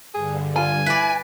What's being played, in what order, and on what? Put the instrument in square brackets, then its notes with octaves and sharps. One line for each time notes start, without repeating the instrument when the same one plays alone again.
[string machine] G2 D3 [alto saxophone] G#4
[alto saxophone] F4 [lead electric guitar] G#5
[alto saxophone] E4 [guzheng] B4 D5